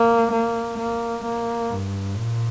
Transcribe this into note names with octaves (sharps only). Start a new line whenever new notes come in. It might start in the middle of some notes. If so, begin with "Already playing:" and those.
Already playing: A#3
A#3
A#3
A#3
G2
A#2